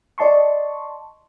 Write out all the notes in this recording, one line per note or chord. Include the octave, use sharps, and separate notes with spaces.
D5 D#5 A5 C6 C#6